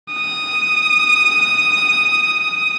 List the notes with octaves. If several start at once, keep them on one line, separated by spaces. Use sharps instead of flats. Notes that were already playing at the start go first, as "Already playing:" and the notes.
D#6